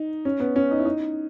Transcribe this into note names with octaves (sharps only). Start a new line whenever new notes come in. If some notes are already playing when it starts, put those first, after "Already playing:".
Already playing: D#4
C#4
B3
C#4
D#4
E4
D#4